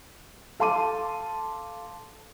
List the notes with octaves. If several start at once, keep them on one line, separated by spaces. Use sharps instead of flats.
A4 F5 A5 C6 D6 D#7